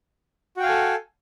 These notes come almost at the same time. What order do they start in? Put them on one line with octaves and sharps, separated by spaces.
F#4 G5 F5 G#5 A4